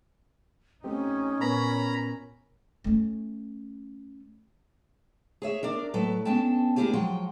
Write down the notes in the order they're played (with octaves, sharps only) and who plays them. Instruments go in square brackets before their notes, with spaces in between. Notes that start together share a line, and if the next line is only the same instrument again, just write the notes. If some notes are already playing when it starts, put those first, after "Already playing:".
[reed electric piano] A3 C4 G4 [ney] C#4 [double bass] D#4
[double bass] A#2 [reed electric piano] B3 A#4 C#5 [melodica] A#5 B5
[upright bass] A3 C#4
[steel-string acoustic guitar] G#4 C#5 E5
D4 A#4 D5
A2 F#3 A4 B4
B3 C#4 D4 G5 A5
A#3 D4 E4 G4 G#4 G#5
F3 F#3 G#3 F#5 G5